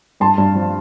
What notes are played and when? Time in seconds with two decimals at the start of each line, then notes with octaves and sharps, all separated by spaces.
0.20 G2 A5 C6
0.38 G2
0.55 F3